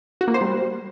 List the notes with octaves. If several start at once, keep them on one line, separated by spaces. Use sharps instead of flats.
F#4
A#3
C5
G3